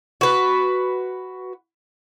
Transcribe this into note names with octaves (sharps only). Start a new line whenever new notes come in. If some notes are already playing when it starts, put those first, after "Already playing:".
F#4 B4